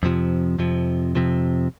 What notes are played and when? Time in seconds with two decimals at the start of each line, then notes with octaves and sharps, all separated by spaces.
0.03 F2 C3 F3
0.59 F2 C3 F3
1.15 F2 C3 F3